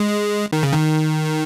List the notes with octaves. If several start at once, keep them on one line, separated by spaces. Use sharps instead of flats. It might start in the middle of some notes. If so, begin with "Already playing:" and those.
Already playing: G#3
D#3
C#3
D#3